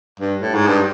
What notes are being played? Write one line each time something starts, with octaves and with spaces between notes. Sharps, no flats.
G2
A2
G#2
G2